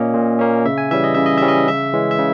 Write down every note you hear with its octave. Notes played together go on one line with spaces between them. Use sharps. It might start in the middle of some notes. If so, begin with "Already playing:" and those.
Already playing: A#2 A#3 C#4 D#5
A#2
A#3 C#4
C#3 E5
G#5
E3 G3 C#4 E5
D#5
C#3 E5
D#5
E3 G3 C#4 E5
D#5
C#3 E5
E3 G#3 C#4
E5
C#3